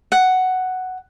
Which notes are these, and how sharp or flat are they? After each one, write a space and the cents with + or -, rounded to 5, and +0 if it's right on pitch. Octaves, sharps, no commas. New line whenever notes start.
F#5 +5